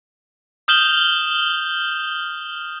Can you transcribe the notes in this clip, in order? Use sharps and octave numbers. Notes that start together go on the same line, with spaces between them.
D#6 F6 G6 E7 F#7 G7